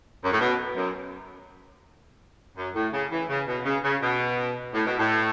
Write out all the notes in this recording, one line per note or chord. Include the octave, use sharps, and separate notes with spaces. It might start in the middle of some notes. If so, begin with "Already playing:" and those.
F#2
A2
B2
F#2
F#2
A2
C#3
E3
C#3
B2
C#3
C#3
B2
A2
B2
A2